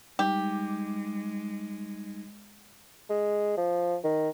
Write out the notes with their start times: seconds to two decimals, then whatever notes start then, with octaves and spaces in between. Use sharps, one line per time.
0.19 G3 G#3 D#4 G4
3.10 G#3
3.57 F3
4.04 D#3